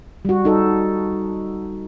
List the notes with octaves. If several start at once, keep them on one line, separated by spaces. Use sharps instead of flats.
G3 F#4
D#4 A4